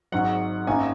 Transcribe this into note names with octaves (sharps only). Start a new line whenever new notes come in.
G#1 G#2 F#3 F#5
G#1 F#2 D#3 A#3 G#5